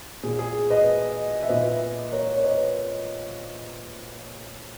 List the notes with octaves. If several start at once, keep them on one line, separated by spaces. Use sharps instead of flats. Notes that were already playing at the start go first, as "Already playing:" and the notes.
A#2 G#4
G#4
B4 D#5
E5
A#2 B4 D#5
A#4 C#5
C#5
B4 D#5